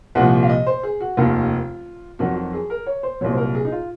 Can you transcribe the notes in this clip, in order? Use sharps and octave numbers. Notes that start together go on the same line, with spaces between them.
C2 A#2 F3 F#5
F5
D#5
C5
G#4
F#4
F1 D#2 D#3 F4
F2 D#3 F#3 F#4
F#4
G#4
A#4
C#5
C5
C2 A#2 F#3 C#5
C5
A#4
G#4
D#4
F4